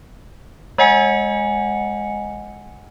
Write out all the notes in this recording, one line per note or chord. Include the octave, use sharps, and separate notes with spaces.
G#3 D#5 F#5 G#5 C#7